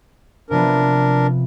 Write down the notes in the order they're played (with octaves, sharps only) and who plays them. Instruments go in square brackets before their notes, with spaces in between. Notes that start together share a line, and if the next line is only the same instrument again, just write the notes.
[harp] C3 F3 B3 [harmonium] D4 A#4